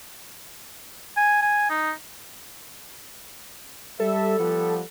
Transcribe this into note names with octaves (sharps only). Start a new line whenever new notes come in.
G#5
G#5
D#4
G3 A4 E5
F3 G3 B3